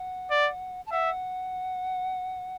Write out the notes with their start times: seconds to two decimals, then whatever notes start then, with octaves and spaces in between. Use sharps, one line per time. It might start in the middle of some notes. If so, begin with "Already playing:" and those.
Already playing: F#5
0.31 D5
0.86 A5
0.92 E5 F#5